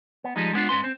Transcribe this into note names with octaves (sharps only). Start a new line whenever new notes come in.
B3
F3 G3 G#3 D#4
G#3 A#3 B3 D4 F4
G#2 C#4 B4 C6
C4